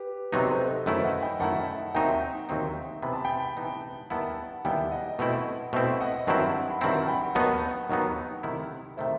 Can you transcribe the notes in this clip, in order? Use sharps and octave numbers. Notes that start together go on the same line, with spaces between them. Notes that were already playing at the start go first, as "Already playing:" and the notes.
Already playing: G4 B4
C3 F#3 B3 D#4 B4 D#5
A4 C5
B4 D#5
F#2 D#3 A3 E4 C5 E5
D#5 F#5
G5 B5
F#2 D#3 A3 E4 F#5 A5
D#2 D#3 F#3 C4 D#4 E5 G5
D#2 D#3 F#3 C4 D#4
C3 E3 B3 D#4 B5
A5
G5 B5
C3 E3 B3 D#4
D#2 D#3 G3 B3 E4 F#5 A5
D#2 D#3 G3 B3 E4 E5 G5
D#5 F#5
B2 A3 C4 E4
B2 A3 C4 E4 C5 E5
D#5 F#5
G2 D#3 F#3 C4 E4 F#5 A5
B5
G2 D#3 F#3 C4 E4 F#5 A5
G5 B5
D#2 D#3 F#3 B3 D#4 F#5 A5
D#2 D#3 F#3 B3 D#4
C3 D#3 A3 E4
C3 D#3 A3 E4 C5 E5